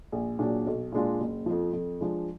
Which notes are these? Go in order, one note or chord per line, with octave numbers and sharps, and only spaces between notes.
A#1
A#2 F#3 D4 G#4
B1
A#2 G#3 D4 F4
F#1
F2 F3
F2
F3 G#3 D4